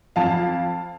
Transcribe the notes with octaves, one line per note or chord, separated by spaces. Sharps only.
F2 F5 A5